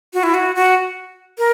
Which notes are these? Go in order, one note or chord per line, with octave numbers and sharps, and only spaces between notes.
F#4
E4
F#4
F#4
A#4